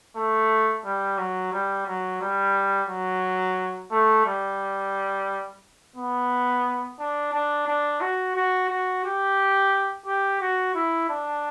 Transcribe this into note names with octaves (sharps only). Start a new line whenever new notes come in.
A3
G3
F#3
G3
F#3
G3
F#3
A3
G3
B3
D4
D4
D4
F#4
F#4
F#4
G4
G4
F#4
E4
D4